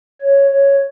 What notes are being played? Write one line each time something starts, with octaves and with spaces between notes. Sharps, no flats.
C#5
C#5